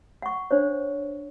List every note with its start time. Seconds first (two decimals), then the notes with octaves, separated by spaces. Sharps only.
0.22 F#5 C#6
0.51 D4 C5 C#5